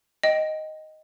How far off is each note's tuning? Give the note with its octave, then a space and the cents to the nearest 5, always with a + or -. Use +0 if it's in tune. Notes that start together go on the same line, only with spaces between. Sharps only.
D#5 +0 G5 -10